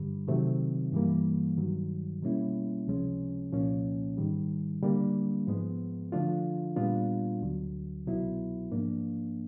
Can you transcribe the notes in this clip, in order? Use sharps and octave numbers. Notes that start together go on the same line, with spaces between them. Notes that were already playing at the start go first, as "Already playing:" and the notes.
Already playing: G2 D3 G3
C3 D#3 F#3 A3 C4
G2 E3 G3 A#3
G2 D#3 F#3
B2 G3 A#3 C#4 E4
C#2 C3 F3 G#3 C#4
C2 A#2 F3 A#3 C#4
G#2 D#3 G3
D3 G3 A#3 D4
G#2 F3 G#3 B3
D3 F3 A3 D4 F4
A#2 G3 B3 D4 F4
D2 D3 F#3
C2 B2 F#3 B3 E4
G#2 F3 A#3 D4